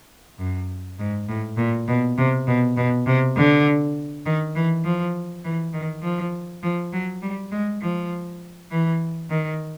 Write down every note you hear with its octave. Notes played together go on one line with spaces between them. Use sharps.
F#2
G#2
A2
A#2
B2
C3
B2
B2
C3
D3
D#3
E3
F3
E3
D#3
F3
F3
F#3
G3
G#3
F3
E3
D#3